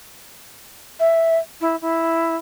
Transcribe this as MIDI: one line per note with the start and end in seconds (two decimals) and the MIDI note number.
0.99 1.38 76
1.61 1.76 64
1.81 2.36 64